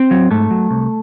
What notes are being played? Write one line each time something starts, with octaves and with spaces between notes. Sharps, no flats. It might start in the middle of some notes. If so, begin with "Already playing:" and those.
Already playing: C4
F#3
G#2 A3
F#3
C2